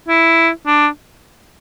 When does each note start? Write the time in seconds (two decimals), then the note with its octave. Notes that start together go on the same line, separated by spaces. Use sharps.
0.08 E4
0.66 D4